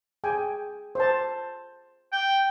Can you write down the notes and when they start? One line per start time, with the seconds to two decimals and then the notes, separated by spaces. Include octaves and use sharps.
0.24 G#4 G5 G#5
0.95 C5 A5
2.12 G5